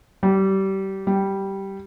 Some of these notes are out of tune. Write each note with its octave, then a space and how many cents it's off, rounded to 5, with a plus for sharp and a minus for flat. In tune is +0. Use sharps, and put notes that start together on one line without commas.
G3 -25
G3 -10